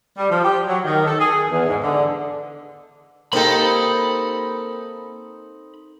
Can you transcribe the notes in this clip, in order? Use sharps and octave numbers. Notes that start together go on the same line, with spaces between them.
G3
F3
G4
F#3
D#3
A4
G#4
E2
G#2
D3
A#3 C4 D#4 G4 A4 B5